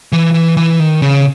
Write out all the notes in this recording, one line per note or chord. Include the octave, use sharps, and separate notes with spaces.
E3
E3
E3
D#3
C#3